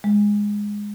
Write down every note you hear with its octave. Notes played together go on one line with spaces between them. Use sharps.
G#3